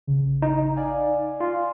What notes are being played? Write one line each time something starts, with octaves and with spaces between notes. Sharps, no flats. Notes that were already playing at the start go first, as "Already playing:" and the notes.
A1 C#3
D#4
D5 F5 G#5
F4